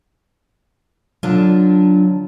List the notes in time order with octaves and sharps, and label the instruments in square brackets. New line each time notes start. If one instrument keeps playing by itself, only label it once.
[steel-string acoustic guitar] D3 D4 F4 [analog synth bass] F#3